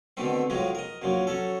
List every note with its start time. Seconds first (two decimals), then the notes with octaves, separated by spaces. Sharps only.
0.17 B2 D3 D#3 A3 C4
0.50 A2 F3 F#3 G#3 D#4
0.75 A#4 D#5
1.02 A#1 F#2 F3 F#3
1.27 F#3 C#4 A4